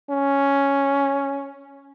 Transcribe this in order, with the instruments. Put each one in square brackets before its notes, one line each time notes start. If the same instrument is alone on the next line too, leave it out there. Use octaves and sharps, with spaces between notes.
[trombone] C#4